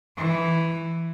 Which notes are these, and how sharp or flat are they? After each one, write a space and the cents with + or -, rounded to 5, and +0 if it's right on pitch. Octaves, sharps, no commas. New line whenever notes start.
E3 +5